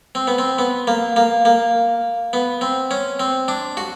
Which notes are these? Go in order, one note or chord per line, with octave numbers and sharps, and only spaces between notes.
C4
B3
C4
B3
A#3
A#3
A#3
B3
C4
C#4
C4
D4
F#4